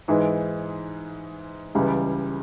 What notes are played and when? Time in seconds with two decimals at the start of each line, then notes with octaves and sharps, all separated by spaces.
0.08 G#2 E3 G#3
1.75 C#2 C#3 E3 G3